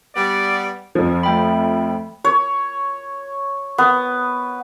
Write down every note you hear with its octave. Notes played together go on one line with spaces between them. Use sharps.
G3 B3 D5
F2 F3
A3 G5 B5
C#5
B3